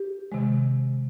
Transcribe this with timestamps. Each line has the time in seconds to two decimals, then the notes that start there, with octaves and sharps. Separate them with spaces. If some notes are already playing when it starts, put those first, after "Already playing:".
Already playing: G4
0.32 C3 D#3 G#3